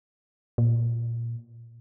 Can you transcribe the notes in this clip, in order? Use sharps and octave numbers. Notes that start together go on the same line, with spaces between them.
A#2